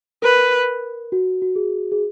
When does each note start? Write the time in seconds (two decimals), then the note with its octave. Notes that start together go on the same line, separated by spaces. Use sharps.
0.22 A#4 B4
1.12 F#4
1.42 F#4
1.56 G#4
1.92 G#4